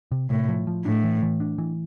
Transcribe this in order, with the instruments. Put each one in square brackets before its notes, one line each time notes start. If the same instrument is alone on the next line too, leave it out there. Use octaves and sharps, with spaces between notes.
[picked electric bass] C3
[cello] A2 [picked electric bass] C3
[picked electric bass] F3
F3
[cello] A2 [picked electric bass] D4
[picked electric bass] E3
E3
D4
E3